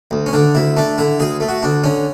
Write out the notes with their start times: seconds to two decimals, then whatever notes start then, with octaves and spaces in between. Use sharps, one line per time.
0.11 D2
0.26 C#4
0.33 D3 D4
0.55 D2 E4
0.77 A3 D4
0.98 D3 E4
1.20 D2 G#4
1.40 A3
1.49 F#4
1.63 D2 D4
1.84 D3 C#4